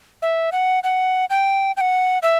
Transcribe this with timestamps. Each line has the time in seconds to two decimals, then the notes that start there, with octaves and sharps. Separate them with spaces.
0.22 E5
0.52 F#5
0.84 F#5
1.30 G5
1.77 G5
1.81 F#5
2.23 E5